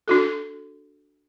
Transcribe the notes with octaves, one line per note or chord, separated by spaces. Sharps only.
D4 F#4 A4